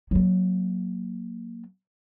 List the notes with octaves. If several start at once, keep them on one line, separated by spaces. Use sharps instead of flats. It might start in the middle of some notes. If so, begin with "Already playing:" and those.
F#3 A#3